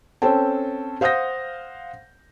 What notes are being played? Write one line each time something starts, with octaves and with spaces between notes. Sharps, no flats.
C4 C#4 A4 C5 G5 A5
C5 F5 F#5 D#6 G6 A#6